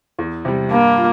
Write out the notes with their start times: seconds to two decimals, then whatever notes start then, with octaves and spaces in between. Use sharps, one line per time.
0.19 E2
0.45 C3 G3
0.71 G2 A#3
0.97 F4